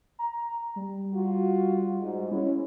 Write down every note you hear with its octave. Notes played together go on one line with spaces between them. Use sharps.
A#5
G3
F4 F#4
G#2
G#3 C#4 E4